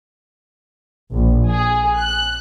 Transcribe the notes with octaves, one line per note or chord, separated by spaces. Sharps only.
A#1
G#4
F#6